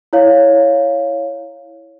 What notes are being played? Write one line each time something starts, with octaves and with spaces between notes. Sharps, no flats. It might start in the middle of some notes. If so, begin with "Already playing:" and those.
E4 C#5 F5